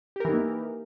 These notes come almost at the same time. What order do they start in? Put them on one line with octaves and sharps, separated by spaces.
G4 A#4 E3 D#4 A#3